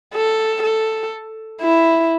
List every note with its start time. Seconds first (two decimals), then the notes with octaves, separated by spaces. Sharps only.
0.14 A4
0.63 A4
1.61 E4